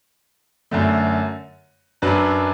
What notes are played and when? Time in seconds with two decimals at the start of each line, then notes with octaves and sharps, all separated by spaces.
0.71 F#2 D3 A3
2.02 F#2 F#3 D4 B4